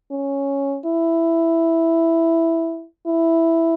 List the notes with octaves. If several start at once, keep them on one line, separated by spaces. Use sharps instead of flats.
C#4
E4
E4